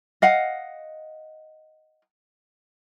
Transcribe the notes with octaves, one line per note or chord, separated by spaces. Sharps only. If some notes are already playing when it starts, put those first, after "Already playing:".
D#5 F5 F#5